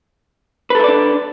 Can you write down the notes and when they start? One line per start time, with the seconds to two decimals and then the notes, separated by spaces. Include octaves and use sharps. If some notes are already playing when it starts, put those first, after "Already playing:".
0.70 B4
0.75 A4
0.79 E4
0.84 D5
0.88 D4